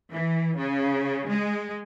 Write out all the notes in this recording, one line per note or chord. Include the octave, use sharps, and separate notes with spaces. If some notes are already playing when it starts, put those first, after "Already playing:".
E3
C#3
G#3